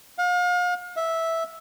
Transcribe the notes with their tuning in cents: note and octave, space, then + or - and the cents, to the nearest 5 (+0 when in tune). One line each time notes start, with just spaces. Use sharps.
F5 +40
E5 -10